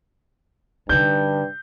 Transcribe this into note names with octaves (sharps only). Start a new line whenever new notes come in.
G2 D3 D#4 G6